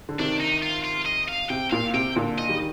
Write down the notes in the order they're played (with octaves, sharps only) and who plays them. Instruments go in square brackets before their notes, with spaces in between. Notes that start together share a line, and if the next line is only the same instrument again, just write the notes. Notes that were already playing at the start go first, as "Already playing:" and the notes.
[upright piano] D3
[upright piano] C3 D#3 [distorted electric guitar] D4
[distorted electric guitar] D#4
F4
F4
D#5
F5
[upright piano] C3 [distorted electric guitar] G5
[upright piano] A#2 [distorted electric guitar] F5
[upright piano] C3 [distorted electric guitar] G5
[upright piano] A#2 D3
[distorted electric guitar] D#5
[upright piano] D#3 G3